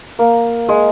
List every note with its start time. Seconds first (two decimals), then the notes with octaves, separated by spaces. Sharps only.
0.19 A#3
0.69 G#3